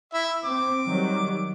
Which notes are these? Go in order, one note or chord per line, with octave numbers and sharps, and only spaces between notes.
E4 E5
C4 D6
D#3 F#3 G3